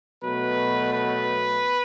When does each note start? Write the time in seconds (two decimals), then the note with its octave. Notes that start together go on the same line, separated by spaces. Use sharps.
0.22 B2 F#3 A3 B4
0.92 B4